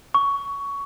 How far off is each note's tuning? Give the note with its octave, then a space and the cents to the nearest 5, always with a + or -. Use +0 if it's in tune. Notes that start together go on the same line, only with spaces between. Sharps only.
C#6 +15